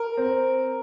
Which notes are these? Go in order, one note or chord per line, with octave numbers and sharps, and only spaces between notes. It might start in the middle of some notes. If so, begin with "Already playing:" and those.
Already playing: A#4
C4